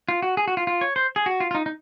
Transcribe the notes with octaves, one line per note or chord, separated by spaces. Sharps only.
F4
F#4
G#4
F#4
F4
F4
C#5
C5
G#4
F#4
F4
F4
D#4
D#4